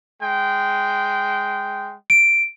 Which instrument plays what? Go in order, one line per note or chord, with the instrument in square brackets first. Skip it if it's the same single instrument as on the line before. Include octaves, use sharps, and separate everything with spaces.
[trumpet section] G#3 G5
[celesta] D7